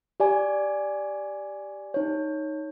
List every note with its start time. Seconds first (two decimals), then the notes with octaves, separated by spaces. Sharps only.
0.20 G4 D5 G#5
1.94 D#4 C#5